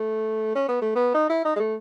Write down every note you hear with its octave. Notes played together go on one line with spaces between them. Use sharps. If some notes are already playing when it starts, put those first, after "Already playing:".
Already playing: A3
C#4
B3
A3
B3
D#4
E4
D#4
G#3
A3